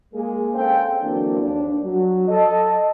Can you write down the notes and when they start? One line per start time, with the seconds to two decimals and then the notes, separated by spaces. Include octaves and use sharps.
0.14 G#3 A#3 G#4
0.54 C4 C#4 A4 C5 F5 G5
1.01 D3 E3 F#3 A#3 C4 D4
1.41 D#2 D4
1.84 F#3
2.28 A4 D#5